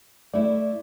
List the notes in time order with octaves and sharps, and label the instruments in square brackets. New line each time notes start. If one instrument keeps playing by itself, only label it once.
[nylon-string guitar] A3 E4 [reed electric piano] D5